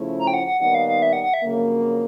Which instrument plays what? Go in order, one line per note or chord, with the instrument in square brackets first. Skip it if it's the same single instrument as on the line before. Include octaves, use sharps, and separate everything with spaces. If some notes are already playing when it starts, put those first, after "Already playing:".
Already playing: [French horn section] C#3 F3 A3 C#4 E4
[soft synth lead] A#5
G5
F#5
F#5
[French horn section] D#2 D#3 G3 B3 D#4 [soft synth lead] F#5
[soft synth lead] F5
F5
E5
F#5
F#5
E5
[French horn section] F2 C#3 F#3 A#3